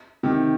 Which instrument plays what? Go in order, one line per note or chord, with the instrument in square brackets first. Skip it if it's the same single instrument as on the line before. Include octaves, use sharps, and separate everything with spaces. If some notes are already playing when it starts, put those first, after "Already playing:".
[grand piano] C3 D#3